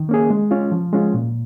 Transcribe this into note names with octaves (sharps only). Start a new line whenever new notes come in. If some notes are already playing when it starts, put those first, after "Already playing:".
Already playing: D#3
A#3 C#4 G#4
G#3
C#4 F4
F3
G#3 C#4 F4
A#2